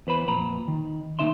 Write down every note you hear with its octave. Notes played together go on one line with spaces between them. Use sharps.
E2 B4 C5 B5
F2 A#2 A#5 B5
D#3
D#2 A#2 D#3 D#4 E5 C6